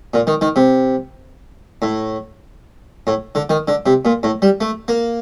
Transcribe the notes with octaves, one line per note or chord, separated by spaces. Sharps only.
A#2
D#3
D#3
C3
A2
A2
D3
D#3
D3
C3
A#2
A2
G3
A3
A#3